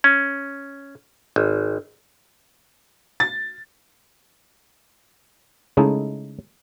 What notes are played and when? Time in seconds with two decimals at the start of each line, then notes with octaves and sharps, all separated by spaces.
0.04 C#4
1.36 G#1
3.20 A6
5.77 C#3 G#3 A3 D#4 E4 A4